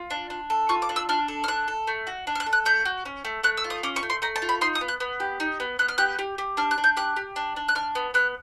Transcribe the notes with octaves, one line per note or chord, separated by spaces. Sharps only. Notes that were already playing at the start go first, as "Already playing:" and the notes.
Already playing: F4
D4
D4
A4
F4 C#6
D6
D4
E6
D4 F6
A4
F6
D4 F#6
A4
A3
F#4
D4
F6
F#6
A4
F#6
A3 G6
F#4
C#4
A3
A3 F#6
E6
F4
D#6
C#4 D6
C#6
A3
C6
A3 A#5
A5
F4
B5
D#4 C6
D#6
B3
F#6
B3
G4
D#4
B3
B3 F#6
F6
G4 F#6
G4
G4
D4 F6
F#6
D4
G6
G4 F#6
G4
D4
D4
F#6
D4 F6
B3
B3 F#6